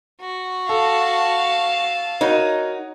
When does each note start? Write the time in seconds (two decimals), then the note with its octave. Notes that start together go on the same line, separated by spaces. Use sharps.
0.21 F#4
0.69 A4 F5 A5
2.21 D#4 F#4 A#4 C#5